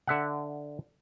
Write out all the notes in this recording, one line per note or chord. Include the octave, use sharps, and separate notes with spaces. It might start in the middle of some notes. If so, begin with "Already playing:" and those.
D3 E5 F#5